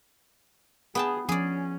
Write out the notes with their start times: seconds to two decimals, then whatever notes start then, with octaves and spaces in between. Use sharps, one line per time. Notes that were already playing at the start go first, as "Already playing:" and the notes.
0.95 B3 G#4 G5 A5
1.29 F3 C#4 G#4 D5